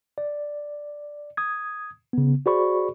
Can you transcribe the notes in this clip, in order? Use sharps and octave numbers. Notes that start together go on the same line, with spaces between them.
D5
D#6 G#6
C#3 B3
F#4 G#4 C5 D5 B5 C#6